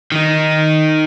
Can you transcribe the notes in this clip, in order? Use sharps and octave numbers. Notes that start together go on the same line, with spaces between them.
D#3 D#4